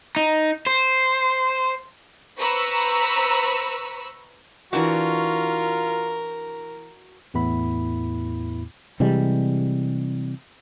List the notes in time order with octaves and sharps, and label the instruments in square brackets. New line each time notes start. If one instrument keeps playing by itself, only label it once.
[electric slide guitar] D#4
C5
[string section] B4 C5 A#5 B5 C#6 E6
[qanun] E3 D4 D6 [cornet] F4 [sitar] F#4 [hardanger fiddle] A#4
[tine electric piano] E2 A2 B3 E4 B5
[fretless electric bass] C3 E3 G3 G#3